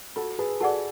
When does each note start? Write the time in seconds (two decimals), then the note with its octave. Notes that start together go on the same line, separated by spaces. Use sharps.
0.16 F4 F#4 A4
0.39 G#4 B4
0.60 F#4 G#4 A4 D5 F#5 A5